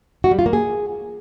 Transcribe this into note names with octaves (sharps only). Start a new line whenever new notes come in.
F#4
G3
F4
A#3
G#4